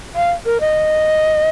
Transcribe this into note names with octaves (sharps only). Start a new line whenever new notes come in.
F5
A#4
D#5